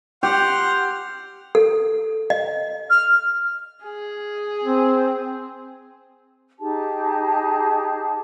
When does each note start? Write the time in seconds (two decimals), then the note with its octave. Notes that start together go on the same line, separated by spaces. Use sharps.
0.23 G4 F#5 C6 F6
1.55 A4
2.30 D#5
2.90 F6
3.84 G#4
4.64 C4
6.60 D#4 G4 G#4 A5